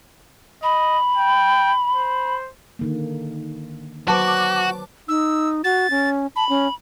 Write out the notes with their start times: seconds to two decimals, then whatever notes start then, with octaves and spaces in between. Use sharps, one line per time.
0.63 D#5 B5
1.16 G5
1.95 C5
2.79 D3 D#3 A#3
4.08 F#3 F#4 B4 C5 A5 D6
5.08 D#4 E6
5.64 F#4 A6
5.90 C#4
6.36 A5 B5
6.49 C#4